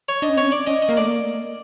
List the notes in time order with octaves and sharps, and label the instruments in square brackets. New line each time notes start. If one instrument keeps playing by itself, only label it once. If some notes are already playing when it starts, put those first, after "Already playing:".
[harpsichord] C#5
[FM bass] D4 [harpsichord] D#5
[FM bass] C#4
[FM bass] C4 [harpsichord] C#5
[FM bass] C#4
[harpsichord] D5
[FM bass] C#4 [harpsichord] D#5
[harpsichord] D#5
[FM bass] A#3
[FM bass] A3 [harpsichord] D5
[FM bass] A#3